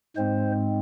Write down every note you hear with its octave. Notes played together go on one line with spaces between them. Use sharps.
G#2 G#3 C4 C5